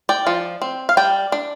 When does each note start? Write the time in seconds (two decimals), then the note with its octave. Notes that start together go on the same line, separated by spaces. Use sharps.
0.09 D5 G5
0.27 F3
0.62 C4
0.89 F5
0.97 G3 D5 G5
1.32 D4